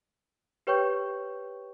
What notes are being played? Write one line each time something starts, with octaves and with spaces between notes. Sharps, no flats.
G4 B4 C#5 G5 C#6 G6